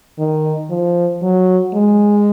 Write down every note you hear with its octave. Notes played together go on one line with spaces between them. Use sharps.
D#3
F3
F#3
G#3